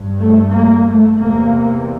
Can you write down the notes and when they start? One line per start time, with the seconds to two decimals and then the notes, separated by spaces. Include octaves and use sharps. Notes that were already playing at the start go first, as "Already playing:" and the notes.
Already playing: G2
0.20 A3
0.52 A#3
0.84 A3
1.16 E2 C3 A#3